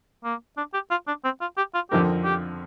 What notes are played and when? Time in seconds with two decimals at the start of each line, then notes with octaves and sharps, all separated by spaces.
0.24 A#3
0.57 D4
0.74 G4
0.91 F4
1.07 D4
1.24 C4
1.41 F4
1.57 G4
1.74 F4
1.91 F2 D3 F3 C4 G4 A#4
2.24 G4